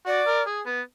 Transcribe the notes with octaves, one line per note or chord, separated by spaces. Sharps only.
F#4 D5
A#4
G#4
B3